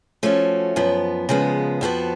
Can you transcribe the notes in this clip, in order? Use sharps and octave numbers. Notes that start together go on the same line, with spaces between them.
F3 A3 C#4 F#4
F#2 F3 B3
C#3 F3 G#3 B3
F2 F3 B3 F#4